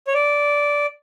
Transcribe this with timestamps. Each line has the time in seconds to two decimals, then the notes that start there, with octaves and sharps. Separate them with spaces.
0.07 C#5
0.14 D5